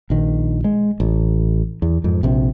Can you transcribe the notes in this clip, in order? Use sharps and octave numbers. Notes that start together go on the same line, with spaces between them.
A#1 D#3
G#3
A1
E2
F2 G#2
A#1 C3